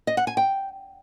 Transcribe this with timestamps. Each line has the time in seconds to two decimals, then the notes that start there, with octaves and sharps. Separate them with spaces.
0.07 D#5
0.17 F#5
0.27 G#5
0.37 G5